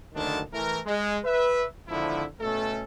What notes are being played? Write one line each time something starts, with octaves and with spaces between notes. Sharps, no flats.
F#1 D2 D3 D#3 D4 A5
E3 A3 A#4
G#3
B4 E5
G#1 D3 F3 E4
B2 A3 C#4 A4